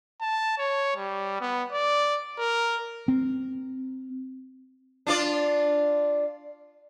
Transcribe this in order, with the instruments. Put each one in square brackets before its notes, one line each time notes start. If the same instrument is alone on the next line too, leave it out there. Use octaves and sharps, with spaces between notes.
[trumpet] A5
C#5
G3
B3
D5
A#4
[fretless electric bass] C4
[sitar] D4 F4 D5